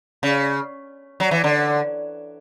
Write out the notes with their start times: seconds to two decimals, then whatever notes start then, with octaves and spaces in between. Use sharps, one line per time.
0.23 C#3
1.20 F#3
1.31 E3
1.44 D3